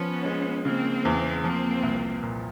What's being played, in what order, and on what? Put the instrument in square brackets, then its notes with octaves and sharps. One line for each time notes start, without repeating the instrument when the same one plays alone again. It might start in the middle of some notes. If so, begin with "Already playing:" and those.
Already playing: [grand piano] F3 [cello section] B3 C#4
[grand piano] G#3
[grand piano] C#3 [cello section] A#3 C4
[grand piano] E2
[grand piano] F3 [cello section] A#3 C4
[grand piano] C2
A#2